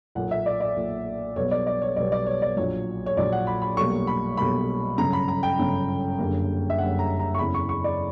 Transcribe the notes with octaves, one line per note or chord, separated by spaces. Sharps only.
B1 A#2 A#3 F#5
E5
D5
D5
B1 A#2 A#3
B1 B2 G3 B3 C#5
D5
D5
C#5
B1 B2 G3 B3 D5
D5
C#5
D5
A#1 A#2 F#3 C#5
C#5
A#1 A#2 F#3 D5
F#5
B5
B5
B1 B2 G3 A#3 C#6
B5
B1 B2 G3 A#3 B5
G1 F#2 C#3 A#5
B5
A#5
G5
G1 F#2 C#3
F#1 F#2 D3 G3 A#3
E5
F#1 F#2 D3 G3 A#3 F#5
A#5
A#5
C#6
F#1 E2 C#3 B5
C#6
C#6
D5